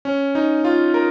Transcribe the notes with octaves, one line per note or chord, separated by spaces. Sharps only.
C#4
D#4
F4
A#4